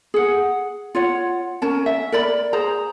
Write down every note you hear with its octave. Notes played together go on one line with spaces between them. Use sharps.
G#4 F#5
F4 C#5 F#5
C#4 A#4 A5
E5
A#4 D5 B5
G#4 C5 A#5